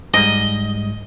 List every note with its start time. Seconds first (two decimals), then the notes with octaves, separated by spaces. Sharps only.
0.14 G#2 G3 G#3 D#5